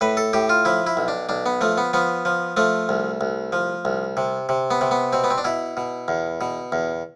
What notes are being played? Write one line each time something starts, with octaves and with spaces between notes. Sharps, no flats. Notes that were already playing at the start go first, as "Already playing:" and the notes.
A2 B4
A4
A2 G4
F4
F3 E4
E4
B1
D4
B1 D4
B3
F3 A3
B3
F3 B3
F3
F3 A3
C2
C2
F3
C2
C3
C3
B3
C3
B3
B2 C4
B3
C4
D4
B2 E4
B2
E2
B2
E2